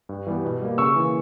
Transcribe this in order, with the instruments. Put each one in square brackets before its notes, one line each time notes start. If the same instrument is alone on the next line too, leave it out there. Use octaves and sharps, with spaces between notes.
[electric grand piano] G2
E3 G3 B3
B2
G3 A#3
C#3 C#6 E6
E3 A#3